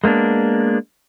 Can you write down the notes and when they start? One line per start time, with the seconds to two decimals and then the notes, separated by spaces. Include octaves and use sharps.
0.04 G#3 A#3 B3 D4